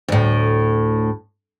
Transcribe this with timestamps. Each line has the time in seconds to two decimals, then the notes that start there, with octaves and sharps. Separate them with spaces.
0.08 D2 A2